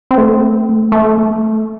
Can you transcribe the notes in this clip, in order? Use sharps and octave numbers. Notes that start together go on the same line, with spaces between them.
C4
A3
A3